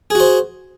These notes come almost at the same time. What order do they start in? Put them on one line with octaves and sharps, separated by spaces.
G#4 F#4 C5